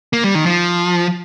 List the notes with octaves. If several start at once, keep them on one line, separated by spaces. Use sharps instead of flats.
A#3
G3
D#3
F3